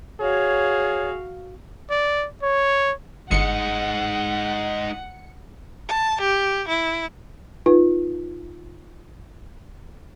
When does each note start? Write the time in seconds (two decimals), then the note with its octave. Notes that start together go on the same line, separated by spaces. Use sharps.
0.20 F#4 G#4 C#5 F5
1.90 D5
2.43 C#5
3.31 G1 G#3 D#4 F#5 C#7
5.89 A5
6.21 G4
6.69 E4
7.66 D#4 F4 B4